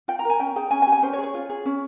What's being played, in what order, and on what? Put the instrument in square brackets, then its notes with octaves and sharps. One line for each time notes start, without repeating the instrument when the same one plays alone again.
[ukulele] F4 G5
A#5
A#4 G#5
C#4 G5
G#4 G5
C#4 G#5
G#5
G4
G#5
C#4 C5
C#5
G#4
C#5
F4
G#4
C#4